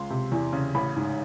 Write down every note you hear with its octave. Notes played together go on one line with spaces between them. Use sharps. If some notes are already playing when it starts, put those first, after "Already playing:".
Already playing: C#2 C6
C3
E2
C#3
A1 B5
G#2